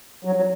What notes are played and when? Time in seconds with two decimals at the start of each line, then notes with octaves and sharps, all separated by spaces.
0.25 F#3
0.35 F#3